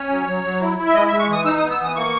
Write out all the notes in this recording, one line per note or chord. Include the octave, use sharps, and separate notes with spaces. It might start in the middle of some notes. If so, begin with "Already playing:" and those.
Already playing: C#4 C#5
F#3
F#3
F#3
E4
E4
E5
G#3 D#5
E5
G#3
C#6
E3 D#6
D#4 E6
D#6
B3
E6
E3 D#6
A#3 C#6